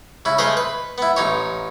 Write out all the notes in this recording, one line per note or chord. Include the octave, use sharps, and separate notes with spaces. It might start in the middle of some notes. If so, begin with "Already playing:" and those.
C#3 E4
G#3 A3 G#4 B4 C5 F5
B4
B3 E4
A1 D#4 C#5